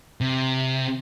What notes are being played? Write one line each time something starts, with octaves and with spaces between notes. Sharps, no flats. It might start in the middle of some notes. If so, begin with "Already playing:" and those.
C3